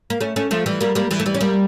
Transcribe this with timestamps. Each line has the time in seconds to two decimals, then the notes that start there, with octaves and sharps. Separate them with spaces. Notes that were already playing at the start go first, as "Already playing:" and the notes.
0.10 A#3
0.20 A3 C#4
0.36 A3 C#4
0.51 F3 A3
0.66 E3 G3
0.81 G3 A#3
0.95 G3 A#3
1.11 E3 G3
1.20 A3
1.26 E3 G3
1.34 C#4
1.41 G3 A#3